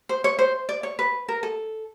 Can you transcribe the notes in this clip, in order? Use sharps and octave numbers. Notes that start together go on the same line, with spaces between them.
C5
C#5
C5
D5
C#5
B4
A#4
A4